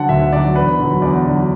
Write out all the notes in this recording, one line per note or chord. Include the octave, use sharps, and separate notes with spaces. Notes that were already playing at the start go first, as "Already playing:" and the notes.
Already playing: D3 F#3 F#5 A5
D2 E5
D3 F#3 D5
E2 B4
D3 F#3
E2 D5
D3 F#3